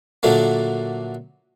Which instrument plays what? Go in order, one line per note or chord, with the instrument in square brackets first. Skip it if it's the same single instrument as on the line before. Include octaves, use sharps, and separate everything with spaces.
[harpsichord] A#2 D3 F#3 A3 A#3